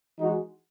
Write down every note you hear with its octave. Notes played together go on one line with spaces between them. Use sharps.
E3 G#3 D#4 F#4